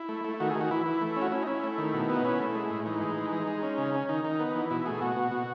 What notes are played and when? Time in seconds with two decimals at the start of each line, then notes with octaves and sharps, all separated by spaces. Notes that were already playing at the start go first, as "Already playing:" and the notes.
Already playing: E4
0.09 A3
0.25 A3
0.40 D#3 F#4
0.50 G#4
0.55 D#3
0.61 F#4
0.71 E3 E4
0.86 E3
1.01 A3
1.16 C#4
1.21 F#4
1.32 C#4 E4
1.43 D#4
1.47 C#4 E4
1.64 A3
1.78 D#3
1.93 B2
2.10 B3
2.16 D#4
2.25 C#4 E4
2.40 A3
2.55 G#3
2.71 A2
2.86 E3 D#4
3.01 G#3
3.17 E3
3.32 G#3
3.47 G#3
3.63 C#4
3.78 C#3
3.94 C#4
4.09 D#3 D#4
4.25 D#3
4.40 B3
4.55 E3
4.70 B2 E4
4.86 A3 G#4
5.01 B2 F#4
5.16 B2
5.32 B2